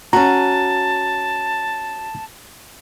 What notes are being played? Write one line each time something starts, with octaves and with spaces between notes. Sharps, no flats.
C#4 F#4 A5 A#5